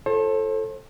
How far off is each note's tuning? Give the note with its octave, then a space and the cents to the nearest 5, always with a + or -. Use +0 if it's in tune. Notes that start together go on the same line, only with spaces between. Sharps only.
F4 -25 A4 +0 C5 +40